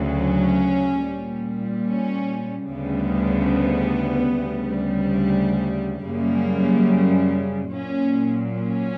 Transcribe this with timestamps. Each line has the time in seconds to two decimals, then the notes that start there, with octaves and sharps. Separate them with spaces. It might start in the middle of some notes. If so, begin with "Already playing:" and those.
Already playing: D2 C#3 F#3
0.19 C#4
1.03 A#2 G3
1.87 C#4
2.71 D2 C#3 G3 B3
4.38 D2 C#3 G3
6.05 F#2 C#3 G3 A#3
7.71 A#2 F#3 C#4
8.55 C#4